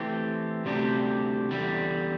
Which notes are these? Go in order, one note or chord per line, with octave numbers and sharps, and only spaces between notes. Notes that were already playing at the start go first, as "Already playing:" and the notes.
Already playing: E3 A3 C4 G4
D2 C3 G3 D4 G4
E2 D3 G3